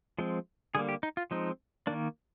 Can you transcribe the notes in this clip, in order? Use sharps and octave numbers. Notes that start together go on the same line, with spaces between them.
F3 G#3 C4
D3 G3 A#3 G#4
G4
D#4
F4
F3 G#3 C4 D#4
D#3 A#3 D4